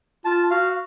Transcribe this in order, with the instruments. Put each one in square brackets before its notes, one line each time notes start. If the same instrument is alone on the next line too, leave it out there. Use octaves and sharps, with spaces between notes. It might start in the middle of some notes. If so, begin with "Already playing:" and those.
[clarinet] F4 [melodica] A5
[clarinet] F#4 [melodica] F5